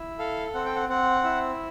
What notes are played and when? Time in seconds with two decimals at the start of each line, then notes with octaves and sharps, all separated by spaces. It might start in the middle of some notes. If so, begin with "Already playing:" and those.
Already playing: E4
0.19 A4 F5
0.54 C4 F#5
0.65 G5
0.75 F#5
0.89 C4 F#5
1.24 E4